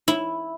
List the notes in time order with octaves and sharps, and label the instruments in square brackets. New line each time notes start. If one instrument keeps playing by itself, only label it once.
[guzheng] E4